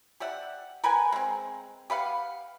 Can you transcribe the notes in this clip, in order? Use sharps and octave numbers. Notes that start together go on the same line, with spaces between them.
G4 D5 E5 F#5
A#4 B4 G5 G#5
G#3 C4
G4 B4 F5 F#5